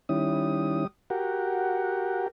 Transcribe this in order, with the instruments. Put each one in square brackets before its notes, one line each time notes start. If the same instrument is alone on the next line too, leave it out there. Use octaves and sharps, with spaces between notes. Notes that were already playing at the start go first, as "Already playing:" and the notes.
[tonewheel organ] D#3 C#4 E4 [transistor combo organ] G3 D#6
[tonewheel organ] F#4 F#5 [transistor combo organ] G4 A#4